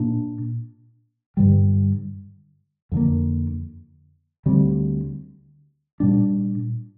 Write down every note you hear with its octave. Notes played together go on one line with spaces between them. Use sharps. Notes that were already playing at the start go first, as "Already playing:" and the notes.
Already playing: A#2 A#3 D4
G2 D3 G3
F2 D3 A#3
D2 D3 G3 C4
A#2 G3 D4